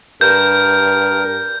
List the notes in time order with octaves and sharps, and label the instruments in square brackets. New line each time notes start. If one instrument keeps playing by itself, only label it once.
[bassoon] G2 [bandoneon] A#4 [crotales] G6